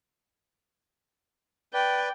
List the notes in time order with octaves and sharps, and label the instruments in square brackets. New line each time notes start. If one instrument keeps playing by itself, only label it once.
[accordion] B4 D5 [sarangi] G5